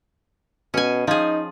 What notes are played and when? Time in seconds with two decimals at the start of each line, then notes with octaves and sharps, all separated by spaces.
0.74 B2 C#4 G#5
1.07 F3 D#4 G#4